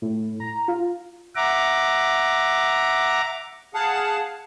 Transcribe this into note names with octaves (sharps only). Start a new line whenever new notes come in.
A2
A#5
F4
E5 F#5 A#5 D6
G#4 F5 F#5 A5